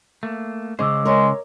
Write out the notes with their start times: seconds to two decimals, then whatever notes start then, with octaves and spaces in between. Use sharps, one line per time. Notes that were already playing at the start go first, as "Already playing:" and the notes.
0.23 A3 A#3
0.79 C#3 G#3 C#4 C5 D#5 D6 E6
1.05 G#3 A#4 C#5